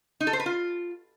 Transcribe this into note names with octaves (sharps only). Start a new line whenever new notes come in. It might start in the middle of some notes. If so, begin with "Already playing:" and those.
D#4
A4
C5
B4
F4